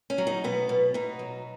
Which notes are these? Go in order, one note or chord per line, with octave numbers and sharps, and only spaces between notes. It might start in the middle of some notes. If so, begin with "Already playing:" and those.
C#4
F#3
D#4
B2 B3
B2
B2 D#4
F#3